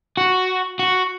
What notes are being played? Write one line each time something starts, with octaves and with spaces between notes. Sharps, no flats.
F#4
F#4